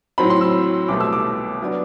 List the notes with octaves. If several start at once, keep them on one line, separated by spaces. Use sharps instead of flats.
A2 F#3 C4 B5
C6
E6
C2 B2 A3 D6
E6
D6
F#3 B3 D4